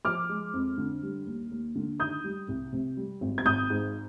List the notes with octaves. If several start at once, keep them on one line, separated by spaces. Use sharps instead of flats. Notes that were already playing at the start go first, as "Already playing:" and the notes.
F3 D6 F6
G#3
F2
D3
G3
D#2
D#2
D3
D#3 D#6 G6
G3
C2
C3
G3
G#1
G#6
G#1 D#6 G6
G#2